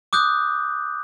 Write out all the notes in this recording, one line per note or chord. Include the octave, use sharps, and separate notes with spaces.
D6 D#6 F#6 G6